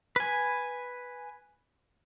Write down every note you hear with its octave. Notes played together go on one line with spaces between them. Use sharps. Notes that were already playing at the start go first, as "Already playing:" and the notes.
B4 G#5